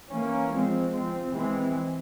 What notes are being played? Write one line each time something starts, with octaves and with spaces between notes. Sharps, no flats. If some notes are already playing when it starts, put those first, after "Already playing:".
E3 A#3 C#4
F3 G#3 C4
F3 C4
E3 G#3 C4